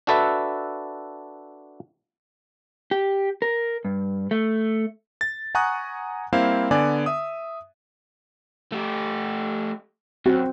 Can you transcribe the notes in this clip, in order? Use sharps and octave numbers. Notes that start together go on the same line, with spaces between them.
D4 F#4 A4 B4 E5
G4
A#4
G2
A3
A6
F#5 G#5 A#5 C#6 D#6 F#6
G3 A#3 C4 E4 C5 F5
D3 B3 D5 G#5 D6
E5 D#6
A3 G4
F#2 C4 F#4